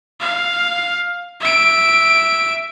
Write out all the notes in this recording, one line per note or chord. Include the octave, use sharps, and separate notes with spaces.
F5
E5 D7